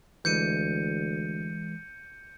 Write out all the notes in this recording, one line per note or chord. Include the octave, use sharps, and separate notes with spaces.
D2 E3 G#3 G6 C#7 D#7